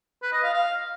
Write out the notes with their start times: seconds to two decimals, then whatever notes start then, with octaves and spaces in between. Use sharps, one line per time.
0.22 B4
0.33 D#5
0.43 F5
0.54 F5